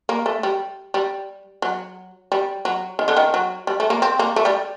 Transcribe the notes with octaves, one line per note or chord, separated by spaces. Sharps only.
A#3
A3
G3
G3
F#3
G3
F#3
D#3
D3
D#3
F#3
G3
A3
A#3
C4
A#3
A3
G3